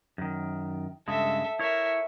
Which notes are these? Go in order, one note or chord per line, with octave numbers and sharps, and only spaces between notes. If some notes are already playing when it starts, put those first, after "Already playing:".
F#2 D#3
G2 C#3 G#3 A4 E5
E4 A#4 C#5 E5